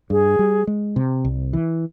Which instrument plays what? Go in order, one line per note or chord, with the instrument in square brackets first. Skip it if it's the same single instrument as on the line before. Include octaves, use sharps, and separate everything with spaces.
[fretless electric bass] G2 [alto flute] G#4
[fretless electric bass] G3
G#3
C3
C2
E3